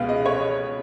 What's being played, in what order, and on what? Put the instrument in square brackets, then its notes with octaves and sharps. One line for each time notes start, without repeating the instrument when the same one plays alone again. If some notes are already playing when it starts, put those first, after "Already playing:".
Already playing: [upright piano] C#2 B2 G#3 B3 F5
D#5
C#5